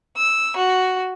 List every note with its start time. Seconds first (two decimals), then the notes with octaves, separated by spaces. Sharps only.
0.17 E6
0.57 F#4